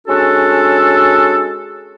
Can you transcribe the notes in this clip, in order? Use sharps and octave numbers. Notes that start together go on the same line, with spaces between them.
G#3 C#4 D4 F#4 A4